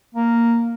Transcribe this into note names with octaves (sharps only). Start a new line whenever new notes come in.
A#3